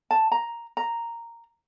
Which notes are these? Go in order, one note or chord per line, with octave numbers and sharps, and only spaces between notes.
A5
A#5
A#5